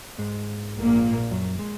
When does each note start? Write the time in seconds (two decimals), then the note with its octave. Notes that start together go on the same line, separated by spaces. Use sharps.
0.18 G#2 G#3
0.75 A#1 A#2 A#3
1.31 F#2 F#3
1.59 G#3